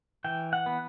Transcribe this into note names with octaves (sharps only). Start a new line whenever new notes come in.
E3 G5
F#5
B3